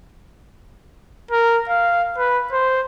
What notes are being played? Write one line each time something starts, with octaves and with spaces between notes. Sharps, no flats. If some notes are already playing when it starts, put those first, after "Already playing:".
A#4
F5
B4
C5